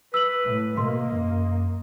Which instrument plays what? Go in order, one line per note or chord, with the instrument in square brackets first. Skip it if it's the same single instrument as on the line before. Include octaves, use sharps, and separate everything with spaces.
[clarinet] B4 [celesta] E6 F#7
[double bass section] A2
[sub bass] B2 [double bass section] A#3 [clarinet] D#5 [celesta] C6
[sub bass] F#2